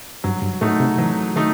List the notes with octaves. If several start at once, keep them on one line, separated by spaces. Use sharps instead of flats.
G2 F#3
G2
A2 A3 D#4 F#4
C3
E3 F#3
D#3 A3 D#4